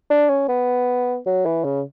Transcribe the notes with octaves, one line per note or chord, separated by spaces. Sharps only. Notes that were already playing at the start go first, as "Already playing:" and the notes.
D4
C#4
B3
F#3
E3
C#3